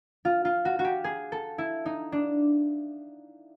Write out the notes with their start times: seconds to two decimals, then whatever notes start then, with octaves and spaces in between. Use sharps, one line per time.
0.25 F4
0.45 F4
0.65 F#4
0.79 F#4
0.85 G4
1.04 G#4
1.32 A4
1.58 E4
1.86 D#4
2.12 D4